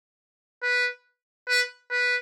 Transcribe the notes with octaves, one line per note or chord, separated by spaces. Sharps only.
B4
B4
B4